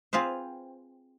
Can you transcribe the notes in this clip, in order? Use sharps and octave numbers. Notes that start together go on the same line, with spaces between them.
C4 F4 G#4 B4 C5